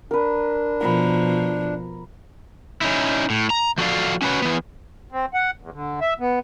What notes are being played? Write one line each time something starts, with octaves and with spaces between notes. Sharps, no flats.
D4 A#4 B4
B2 F3 A#5 B5
C#4 D#4 E4
A2
A#5
F3 F#4 A4 D5 F5
C#4 F#4 G4 B4 C#5
E3 B3
C4
F#5
E2
D3
E5
B3